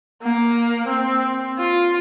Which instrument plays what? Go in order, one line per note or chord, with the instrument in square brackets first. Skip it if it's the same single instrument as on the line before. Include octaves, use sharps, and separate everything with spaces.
[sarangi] A#3
C4
F4